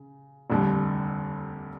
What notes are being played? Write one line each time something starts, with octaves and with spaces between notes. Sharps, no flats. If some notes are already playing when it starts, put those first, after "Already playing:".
Already playing: C#3
F1 D#2 D3 G3